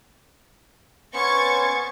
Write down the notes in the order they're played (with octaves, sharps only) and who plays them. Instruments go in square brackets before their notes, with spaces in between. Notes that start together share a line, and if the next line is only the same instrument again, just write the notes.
[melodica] B3 C#4 C5 [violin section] C#6 G#6 A6